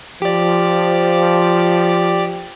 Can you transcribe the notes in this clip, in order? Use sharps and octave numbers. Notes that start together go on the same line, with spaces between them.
F3 G4 D5